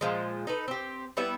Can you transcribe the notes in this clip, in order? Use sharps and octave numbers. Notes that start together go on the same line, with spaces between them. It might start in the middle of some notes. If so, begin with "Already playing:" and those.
A#2 F3 G#3
D#4 A4 B4
C4 G4
G3 B3 E4 E5